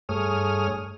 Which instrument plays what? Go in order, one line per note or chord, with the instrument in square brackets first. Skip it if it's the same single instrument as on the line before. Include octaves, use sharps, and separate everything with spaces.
[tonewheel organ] G2 A3 G#4 C#5 D#6 F6